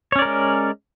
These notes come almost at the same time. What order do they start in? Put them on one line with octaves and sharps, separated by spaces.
C#5 C#4 D5 A#4 G#3